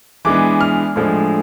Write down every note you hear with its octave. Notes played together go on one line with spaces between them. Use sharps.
E3 G#3 B3 D4 D6
F6
A2 F3 G#3 D4